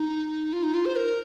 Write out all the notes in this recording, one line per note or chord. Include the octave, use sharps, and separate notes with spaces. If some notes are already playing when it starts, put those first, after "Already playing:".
Already playing: D#4
F4
D#4
F4
C5
A#4